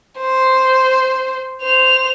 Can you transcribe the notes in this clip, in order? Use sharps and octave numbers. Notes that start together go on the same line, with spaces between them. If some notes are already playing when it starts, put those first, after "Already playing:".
C5
C5 F7